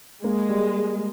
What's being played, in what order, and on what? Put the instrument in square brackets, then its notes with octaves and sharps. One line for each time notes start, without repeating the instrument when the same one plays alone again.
[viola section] G#3 [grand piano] A#3
[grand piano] G3